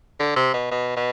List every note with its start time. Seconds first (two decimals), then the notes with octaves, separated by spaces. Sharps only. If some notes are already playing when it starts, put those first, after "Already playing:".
0.20 D3
0.36 C3
0.54 B2
0.71 B2
0.97 B2